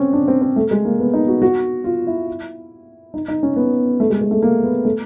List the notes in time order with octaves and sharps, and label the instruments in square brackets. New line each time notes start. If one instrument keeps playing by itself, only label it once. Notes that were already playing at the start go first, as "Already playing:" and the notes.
Already playing: [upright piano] C4 C#4
D4
C4
C4
A3
G#3
A#3
B3
D#4
F#4
F#4
F4
E4
D#4
D#4
C#4
B3
A3
G#3
G#3
A3
A#3
B3
A3